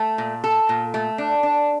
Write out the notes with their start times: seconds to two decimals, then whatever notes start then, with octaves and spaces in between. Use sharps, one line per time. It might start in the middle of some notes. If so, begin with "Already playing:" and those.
Already playing: A3
0.18 A#2
0.44 A4
0.69 A#2
0.94 A3
1.18 D4
1.43 D4